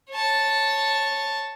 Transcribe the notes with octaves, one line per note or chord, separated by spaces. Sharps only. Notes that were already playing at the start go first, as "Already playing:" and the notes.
C#5 A5